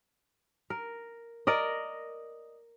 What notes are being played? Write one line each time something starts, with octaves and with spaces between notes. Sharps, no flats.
A#4
A#4 D5 D#5